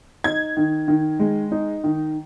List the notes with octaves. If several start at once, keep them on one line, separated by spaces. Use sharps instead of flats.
D#4 G#6
D#3
D#3
G#3
D#4
D#3